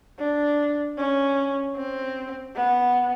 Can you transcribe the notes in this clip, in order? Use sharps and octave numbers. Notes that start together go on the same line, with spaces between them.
D4
C#4
C4
B3